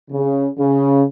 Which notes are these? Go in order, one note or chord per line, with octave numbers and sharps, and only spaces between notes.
C#3
C#3